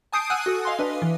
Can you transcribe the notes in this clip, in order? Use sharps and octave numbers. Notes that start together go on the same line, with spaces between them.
G#5 A5 D#6 G6 C7 D7
F#5 G#5 E6 F#6 D#7
F#4 A4 D#6
D#5 F5 G#5 C6
D4 B4 D#5
E3